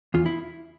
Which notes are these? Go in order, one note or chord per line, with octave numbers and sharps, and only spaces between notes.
E2 F4
E4